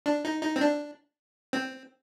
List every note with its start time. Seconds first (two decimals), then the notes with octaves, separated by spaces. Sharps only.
0.06 D4
0.25 D#4
0.42 D#4
0.56 C4
0.61 D4
1.53 C4